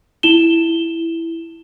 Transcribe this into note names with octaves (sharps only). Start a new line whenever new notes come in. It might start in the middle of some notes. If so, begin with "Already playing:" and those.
E4 E7 G7